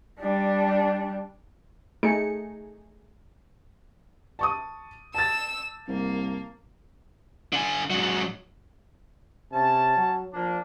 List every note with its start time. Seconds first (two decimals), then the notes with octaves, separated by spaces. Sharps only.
0.20 G3 D4
2.03 A3 D#4 G#4 C#7
4.39 A5 C#6 D#6
5.15 A5 E6 A6 E7
5.88 C2 A#3
7.53 D3 G#5
7.90 G#2 F#3
9.52 C3 C#4 A5
9.97 F#3
10.34 F3 A#3 D4